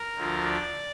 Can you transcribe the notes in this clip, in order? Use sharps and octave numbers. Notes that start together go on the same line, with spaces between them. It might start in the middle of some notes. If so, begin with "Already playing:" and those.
Already playing: A#4
D2 D3 F3
D5